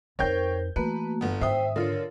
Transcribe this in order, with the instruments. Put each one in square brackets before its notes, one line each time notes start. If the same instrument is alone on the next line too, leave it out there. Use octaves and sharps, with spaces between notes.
[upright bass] F2 D#4 [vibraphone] A#4 C5 [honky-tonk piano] C#5 G5 G6
[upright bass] E3 [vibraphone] A3 A#3 F#4 [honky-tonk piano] B4
[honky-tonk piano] G1 B3
[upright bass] G#2 D#3 [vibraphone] C5 G5 [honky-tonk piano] E5 D#6
[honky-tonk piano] D3 F4 [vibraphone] A#4 C#5